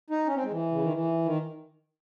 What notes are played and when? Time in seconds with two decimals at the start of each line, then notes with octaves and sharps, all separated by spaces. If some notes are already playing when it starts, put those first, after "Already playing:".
0.10 D#4
0.26 C#4
0.35 C4
0.44 G#3
0.51 E3
0.71 C#3
0.82 D#3
0.93 E3
1.25 D#3